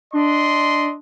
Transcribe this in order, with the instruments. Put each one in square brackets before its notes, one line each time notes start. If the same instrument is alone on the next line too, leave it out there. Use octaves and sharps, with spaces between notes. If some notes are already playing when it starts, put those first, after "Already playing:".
[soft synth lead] D4 [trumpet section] D5 D#5 C6